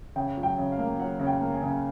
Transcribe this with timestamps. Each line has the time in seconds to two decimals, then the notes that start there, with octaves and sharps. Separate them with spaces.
0.16 C#3 G5
0.37 F#3
0.43 G5
0.58 C#3
0.72 F5
0.79 A#3
0.99 F#3 F#5
1.20 C#3
1.27 G5
1.41 A#3
1.54 G#5
1.62 C#3